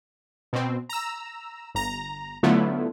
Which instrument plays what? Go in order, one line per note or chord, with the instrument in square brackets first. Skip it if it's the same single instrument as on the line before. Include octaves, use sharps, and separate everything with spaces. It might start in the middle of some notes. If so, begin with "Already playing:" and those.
[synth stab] B2 C4
A#5 E6
G1 A#5
D3 F#3 A3 B3 E4 F4